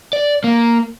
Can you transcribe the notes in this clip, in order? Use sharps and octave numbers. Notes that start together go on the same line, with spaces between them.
D5
A#3